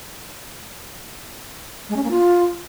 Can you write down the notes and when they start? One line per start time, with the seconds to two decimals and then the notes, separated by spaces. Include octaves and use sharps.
1.89 G#3
1.96 C#4
2.03 A#3
2.10 F4